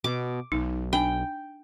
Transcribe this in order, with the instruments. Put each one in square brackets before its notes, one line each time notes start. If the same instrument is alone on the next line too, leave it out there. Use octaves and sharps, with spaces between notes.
[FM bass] B2 [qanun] D6
[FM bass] B1 [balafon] D#4
[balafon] D4 G#5 [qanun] G5